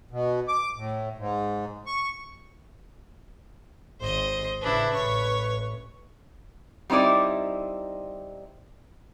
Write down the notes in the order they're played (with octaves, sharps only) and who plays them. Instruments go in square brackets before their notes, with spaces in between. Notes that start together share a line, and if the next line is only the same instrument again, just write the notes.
[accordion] B2
D6
A2
G#2
C#6
[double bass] G#1 [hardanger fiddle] C5 D#5
[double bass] A1 C#3 [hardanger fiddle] D4 E4 [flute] B4
[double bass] A1 [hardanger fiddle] C#5 C#6
[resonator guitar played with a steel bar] G3 C4 D#4 E4 D5